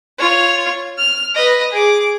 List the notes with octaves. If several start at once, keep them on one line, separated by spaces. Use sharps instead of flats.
F4 C#5
F6
B4 D#5
G#4 D6